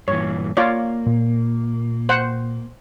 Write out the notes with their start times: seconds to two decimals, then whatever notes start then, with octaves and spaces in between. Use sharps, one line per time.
0.08 G2 A#2 E3 C#5
0.57 A#3 F4 C#5 D5
1.06 A#2
2.09 C5 F#5